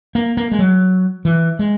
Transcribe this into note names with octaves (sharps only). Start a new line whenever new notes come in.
A#3
A#3
G#3
F#3
E3
G#3